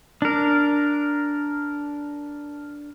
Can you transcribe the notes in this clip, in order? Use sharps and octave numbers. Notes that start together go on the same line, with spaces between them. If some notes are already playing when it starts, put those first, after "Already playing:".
D4 A#4